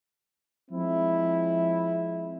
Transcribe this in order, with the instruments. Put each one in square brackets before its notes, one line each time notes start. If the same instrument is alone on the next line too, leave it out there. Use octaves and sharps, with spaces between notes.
[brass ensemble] F3 G#3 C4 E4